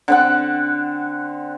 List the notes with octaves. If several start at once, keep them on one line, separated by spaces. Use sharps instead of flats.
D3 C4 F#5